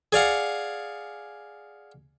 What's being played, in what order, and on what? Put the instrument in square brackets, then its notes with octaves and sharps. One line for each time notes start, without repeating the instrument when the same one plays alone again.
[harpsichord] G#4 D5 F5 F#5